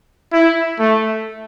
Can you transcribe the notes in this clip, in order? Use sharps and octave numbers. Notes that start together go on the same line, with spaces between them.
E4
A3